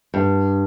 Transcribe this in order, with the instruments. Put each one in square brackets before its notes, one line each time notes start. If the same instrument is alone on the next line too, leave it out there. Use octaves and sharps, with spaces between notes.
[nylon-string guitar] G2